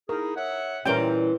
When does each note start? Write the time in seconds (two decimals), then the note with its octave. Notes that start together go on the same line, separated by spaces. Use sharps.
0.09 D#4 E4 G#4 A#4
0.36 C#5 E5 F#5
0.85 A#2 E3 G3 C#4 A#4 G5